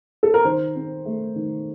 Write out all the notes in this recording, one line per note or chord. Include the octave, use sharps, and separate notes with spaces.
A4
A#4
D#3 C5
C4
A3
D#3